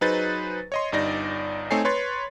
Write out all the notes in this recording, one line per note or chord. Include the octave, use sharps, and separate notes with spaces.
F#3 D#4 G#4 B4 C5 A6
C#5 D#5 C6
G1 G2 D#4 D5 A#6
A3 C4 D#4 C#5 G#5 C7
B4 C#5 C6 A6